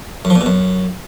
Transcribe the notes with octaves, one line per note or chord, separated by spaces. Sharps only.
F#2
F3
A#2
B2
F#2